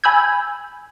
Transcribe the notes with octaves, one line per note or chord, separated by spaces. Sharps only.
G#5 B5 E6 G6 G#6